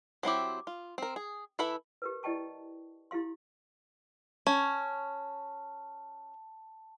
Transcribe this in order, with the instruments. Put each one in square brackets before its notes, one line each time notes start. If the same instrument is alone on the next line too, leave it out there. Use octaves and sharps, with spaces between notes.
[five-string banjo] F#3 C4 E4 G4
F4
C4 A#4
G#4
E3 E4 A4 E5 B5
[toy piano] G4 A#4 B4
E4 D5 D#5 G5 A5 C#6
E4 G4 F5 C6
[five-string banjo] C#4 [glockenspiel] A5